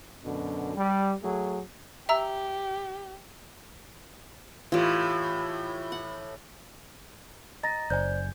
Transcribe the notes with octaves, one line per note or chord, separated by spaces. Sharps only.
F#2 B2 D3
G3
F#3 A3 G#4
G4 E5 A#5 E6
A2 E3 F4 G4
F#5
D#5 A#5 A6 A#6
F#1 C5 D5 G#5 G6